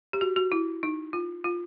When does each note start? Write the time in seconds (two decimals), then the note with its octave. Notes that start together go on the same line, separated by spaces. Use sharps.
0.13 G4
0.21 F#4
0.36 F#4
0.52 E4
0.83 D#4
1.13 F4
1.44 F4